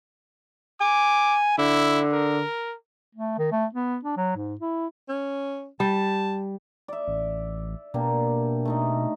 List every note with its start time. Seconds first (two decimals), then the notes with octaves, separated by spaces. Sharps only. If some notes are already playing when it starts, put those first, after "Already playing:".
0.81 G#5 D6
1.58 D3 E4
2.12 A#4
3.15 A3
3.38 D#3
3.52 A3
3.74 B3
4.04 D4
4.17 F#3
4.37 G#2
4.61 E4
5.09 C#4
5.80 G3 A5
6.88 D5 E5
7.07 A1
7.94 B2 A#3 D4 G4
8.65 A3 D#4 D#5